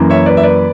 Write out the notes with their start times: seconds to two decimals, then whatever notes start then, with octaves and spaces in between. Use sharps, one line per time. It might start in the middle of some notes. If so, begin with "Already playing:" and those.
Already playing: F#2 E3 A#3
0.10 C#5 E5
0.26 B4 D5
0.37 E5
0.43 B4 D5